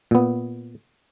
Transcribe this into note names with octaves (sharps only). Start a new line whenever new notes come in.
A#2 B3